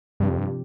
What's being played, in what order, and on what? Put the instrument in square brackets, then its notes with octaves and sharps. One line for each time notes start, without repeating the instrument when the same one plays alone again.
[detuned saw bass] G2 [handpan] C3 F3 C4 G4
[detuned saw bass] F2
G2